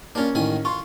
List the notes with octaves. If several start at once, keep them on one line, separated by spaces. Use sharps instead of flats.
A#3 C#4 D4 F4
A1 D#3 G#5
F4 C6 C#6